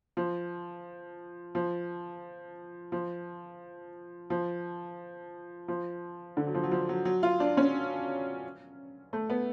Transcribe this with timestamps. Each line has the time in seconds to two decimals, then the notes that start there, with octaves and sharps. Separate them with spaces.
0.17 F3
1.55 F3
2.92 F3
4.30 F3
5.68 F3
6.37 D3
6.47 F#3
6.54 F3
6.63 F#3
6.71 F3
6.89 F#3
7.05 F#3
7.23 F4
7.40 D4
7.57 C#4
9.13 A3
9.30 B3